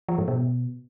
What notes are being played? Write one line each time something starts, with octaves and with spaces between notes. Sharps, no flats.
F3
G#2
B2